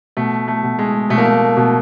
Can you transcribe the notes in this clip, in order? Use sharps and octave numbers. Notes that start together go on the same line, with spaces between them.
B2 A3
A3
B2
G#3
B2 A3
A#3
A3
B2